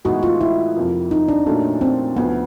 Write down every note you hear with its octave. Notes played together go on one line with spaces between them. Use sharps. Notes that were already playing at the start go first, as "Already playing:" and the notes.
A2 E3 G#3 B3 D#4 F#4
F4
E4
F2 C3 F3 A#3
D#4
D4
A#2 F#3 A3 C#4 D4
C4
D2 C3 F3 B3